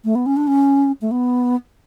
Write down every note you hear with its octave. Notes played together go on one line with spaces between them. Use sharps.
A3
B3
C#4
D4
C#4
A3
B3